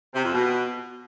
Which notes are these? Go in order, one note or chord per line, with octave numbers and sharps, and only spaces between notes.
C3
F2
B2